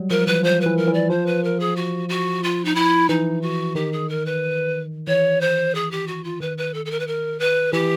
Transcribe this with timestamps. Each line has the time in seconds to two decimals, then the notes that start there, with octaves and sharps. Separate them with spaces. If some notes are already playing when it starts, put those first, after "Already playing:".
Already playing: F#3 G3
0.10 F3 A#4
0.26 E3 B4
0.43 F3 C5
0.60 B4
0.66 E3
0.77 A#4
0.88 E3
0.93 D5
1.10 F3 C5
1.26 B4
1.43 A#4
1.59 G#4
1.76 F#4
2.09 F#4
2.43 F4
2.64 D#4
2.75 E4
3.08 E3 D#4
3.41 F#4
3.75 D#3 G4
3.92 G#4
4.09 A#4
4.25 B4
5.07 E3 C#5
5.41 C5
5.74 G#4
5.91 G4
6.07 F#4
6.24 F4
6.40 D#3 B4
6.57 B4
6.74 A4
6.85 A4
6.90 A#4
6.99 B4
7.07 A#4
7.39 B4
7.72 E3 G4